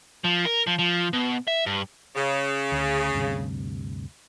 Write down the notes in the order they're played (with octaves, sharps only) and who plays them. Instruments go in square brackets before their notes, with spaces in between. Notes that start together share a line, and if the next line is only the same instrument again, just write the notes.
[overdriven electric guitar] F3
A#4
F3
F3
B2
E5
G2
[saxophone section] C#3
[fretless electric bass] D2
D2 G2 C3